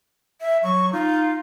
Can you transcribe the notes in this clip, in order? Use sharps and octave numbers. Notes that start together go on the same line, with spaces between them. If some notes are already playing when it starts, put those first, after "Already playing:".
E5
F#3 C#6
D#4 F4